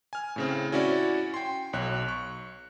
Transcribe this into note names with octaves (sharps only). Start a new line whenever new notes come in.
G#5 F6
A2 C#3 C4
C#4 E4 F#4 C#5 D5
G5 C6
B1 C#5 F#6
C#6